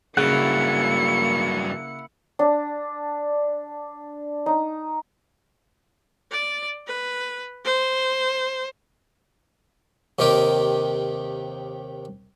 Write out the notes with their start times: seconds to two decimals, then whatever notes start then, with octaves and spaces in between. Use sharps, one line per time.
0.17 G2 C#3 F#3 A#3 E4 F#5 C#7
2.39 D4
4.46 D#4
6.31 D5
6.87 B4
7.65 C5
10.19 D#2 C3 D#3 G4 A#4